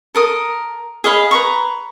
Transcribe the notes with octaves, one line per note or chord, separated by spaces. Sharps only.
A4 A#4 D#6
G#4 D#5 F5 B5
B4 A#5 C#6